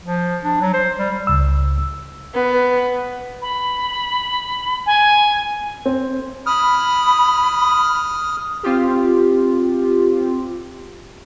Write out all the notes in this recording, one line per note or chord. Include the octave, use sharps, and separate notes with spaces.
F3
D4
F#3
C5
G3
C#2 E6
B3
B5
G#5
C4
B5 D#6 F6
C4 F4 G4